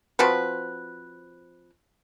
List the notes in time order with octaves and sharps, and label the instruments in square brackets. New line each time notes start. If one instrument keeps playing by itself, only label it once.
[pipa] F3 C4 F#4 B4